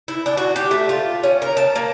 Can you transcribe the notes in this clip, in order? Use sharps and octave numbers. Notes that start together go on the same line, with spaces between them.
E4
D4
F#4
G4
A3
F4
C#4
A#4
A5
A#3